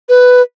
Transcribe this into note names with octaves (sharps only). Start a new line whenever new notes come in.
B4